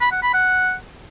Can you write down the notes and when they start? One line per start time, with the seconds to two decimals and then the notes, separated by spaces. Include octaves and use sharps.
0.01 B5
0.12 F#5
0.23 B5
0.34 F#5